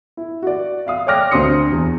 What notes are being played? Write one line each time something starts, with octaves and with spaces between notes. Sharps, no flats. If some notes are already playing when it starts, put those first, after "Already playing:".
E4
F#4 D5
E5 F5 D#6
C#5 D5 G5 D6 F6 A#6
D2 C4 F#4 C6 D#6 C#7
E2